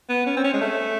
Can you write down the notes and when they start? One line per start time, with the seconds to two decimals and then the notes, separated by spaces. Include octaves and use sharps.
0.09 B3
0.26 C#4
0.37 C4
0.44 C#4
0.53 G#3
0.61 A3